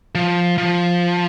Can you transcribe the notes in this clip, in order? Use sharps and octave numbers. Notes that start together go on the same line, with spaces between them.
F3
F3